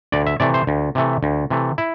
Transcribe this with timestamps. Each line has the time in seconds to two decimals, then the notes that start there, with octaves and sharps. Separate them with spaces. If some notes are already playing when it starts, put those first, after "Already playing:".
0.12 D2 D5
0.27 E5
0.40 C3 E3 A3 D5
0.54 C5
0.67 D2
0.95 C3 E3 A3
1.23 D2
1.50 C3 E3 A3
1.78 E4